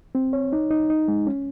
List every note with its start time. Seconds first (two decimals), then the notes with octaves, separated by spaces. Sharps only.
0.15 C4
0.33 C#5
0.53 D#4
0.71 D#4
0.90 D#4
1.08 G#3
1.27 C#4